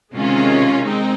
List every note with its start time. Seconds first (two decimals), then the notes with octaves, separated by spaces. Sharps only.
0.14 C3 D#3 G#3 C#4 F4
0.84 G#3 C4 D#4